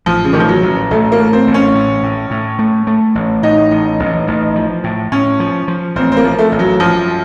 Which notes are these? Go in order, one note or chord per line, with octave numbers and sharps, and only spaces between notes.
A1 F3
C#3
A1 D#3
F3
F#3
A1
A1 A3
A#3
A3
C4
A1
C#4
A2
A2
A2
A3
A3
A1
A2 D#4
A1
A1
A1
F3
A2
A2 C#4
F3
F3
A1 C4
C4
A#3
F3
A3
A1
F#3
F#2 F3